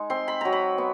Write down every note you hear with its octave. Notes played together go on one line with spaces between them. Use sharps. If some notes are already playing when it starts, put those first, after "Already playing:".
Already playing: G#3 D#4
C4 C6
B5
F#3 A#5
B5
B3